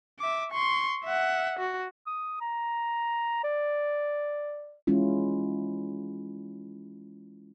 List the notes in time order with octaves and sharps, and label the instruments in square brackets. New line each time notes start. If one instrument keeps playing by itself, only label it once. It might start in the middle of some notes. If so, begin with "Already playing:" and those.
[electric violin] E5 D6
C6 C#6
E5 F#5
F#4
[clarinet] D#6
A#5
D5
[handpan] E3 G#3 C#4 E4 F4